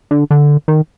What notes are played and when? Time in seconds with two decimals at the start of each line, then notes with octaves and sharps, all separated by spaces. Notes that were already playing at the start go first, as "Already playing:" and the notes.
0.11 D3
0.31 D3
0.68 D#3